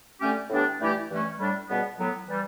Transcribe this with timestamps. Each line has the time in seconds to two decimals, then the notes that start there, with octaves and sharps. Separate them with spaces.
0.20 D3 A3 C#4 G4
0.50 A2 E3 B3 D4 G4
0.79 G2 E3 A3 E4 G4
1.09 G2 E3 A3 C#4
1.39 A2 G3 D4
1.69 C#2 B2 G3 B3
1.98 A2 F#3 B3
2.28 E3 G3